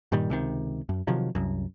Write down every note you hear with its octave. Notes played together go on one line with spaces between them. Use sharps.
G2 A#2 D#3 G3
C#2 C3 D#3
F#2
C3 D#3 F3 F#3
C2 F#2